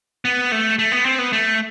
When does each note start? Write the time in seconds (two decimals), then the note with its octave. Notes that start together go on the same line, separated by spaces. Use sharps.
0.25 B3
0.52 A3
0.79 A3
0.92 B3
1.05 C4
1.19 B3
1.33 A3